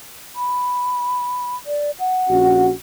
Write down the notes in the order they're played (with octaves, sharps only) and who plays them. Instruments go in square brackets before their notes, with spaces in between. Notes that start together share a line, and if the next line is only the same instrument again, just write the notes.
[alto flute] B5
D5
F#5
[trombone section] A#1 C#4 F#4